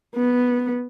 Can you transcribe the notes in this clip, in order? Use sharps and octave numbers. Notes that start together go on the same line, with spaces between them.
B3